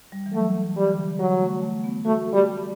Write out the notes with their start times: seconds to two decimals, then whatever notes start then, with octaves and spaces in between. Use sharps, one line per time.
0.12 G3
0.26 E3
0.33 F#3 A3
0.63 E3
0.77 G3
0.87 E3
0.91 D3
1.19 F#3 G3
1.41 A3
1.62 A3
1.84 B3
2.05 A3 F#4
2.33 G3